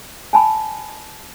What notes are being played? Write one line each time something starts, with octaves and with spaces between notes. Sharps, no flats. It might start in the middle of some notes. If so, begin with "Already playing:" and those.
G#5 A5 B5